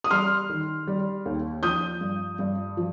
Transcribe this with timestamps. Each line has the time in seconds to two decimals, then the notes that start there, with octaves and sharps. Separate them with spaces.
0.04 D#6
0.11 G3 C6 F6
0.50 D#3
0.87 G3
1.25 D#2
1.63 F3 D#6 G6
2.01 G2
2.39 G2
2.77 F3